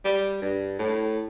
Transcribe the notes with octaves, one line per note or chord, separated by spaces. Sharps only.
G3
G2
A2